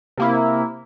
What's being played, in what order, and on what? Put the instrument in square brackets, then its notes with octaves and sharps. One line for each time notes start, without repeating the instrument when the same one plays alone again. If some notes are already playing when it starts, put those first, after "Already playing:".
[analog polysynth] C3 A#3 E4